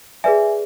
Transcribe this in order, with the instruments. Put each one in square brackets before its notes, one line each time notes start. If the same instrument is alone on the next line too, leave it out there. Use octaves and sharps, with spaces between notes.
[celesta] G#4 B4 D5 E5 G#5